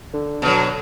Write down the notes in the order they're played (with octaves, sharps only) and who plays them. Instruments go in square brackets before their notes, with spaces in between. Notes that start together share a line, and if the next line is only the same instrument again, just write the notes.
[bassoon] D3
[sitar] B2 F#3